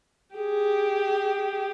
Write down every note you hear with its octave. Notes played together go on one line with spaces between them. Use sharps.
G4 G#4